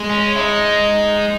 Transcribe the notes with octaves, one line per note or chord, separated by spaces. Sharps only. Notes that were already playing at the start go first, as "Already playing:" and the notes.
Already playing: G#3
C#4
E4
D#4